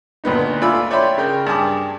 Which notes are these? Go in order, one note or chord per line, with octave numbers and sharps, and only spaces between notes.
D2 A#2 B3 D#4
A3 F4 D5 G#5 B5 E6
C#5 D5 E5 G5 B5 C6
C#3 A#4 G5
G2 G#4 A5 D6